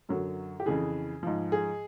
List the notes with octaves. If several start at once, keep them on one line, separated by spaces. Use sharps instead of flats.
F#2 D3 F#3
G4
F2 C#3 E3 G#4
G#2 F3
G#4